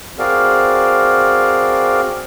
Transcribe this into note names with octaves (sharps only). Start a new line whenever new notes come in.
C4 F#4 G#4 A#4 D5 F5